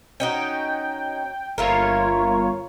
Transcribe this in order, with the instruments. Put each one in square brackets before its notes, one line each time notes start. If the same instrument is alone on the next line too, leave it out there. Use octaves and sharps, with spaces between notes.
[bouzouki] C#4 D#4 F#4 [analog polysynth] G5
[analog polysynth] G1 F4 C#5 [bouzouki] A#3 E4 A#4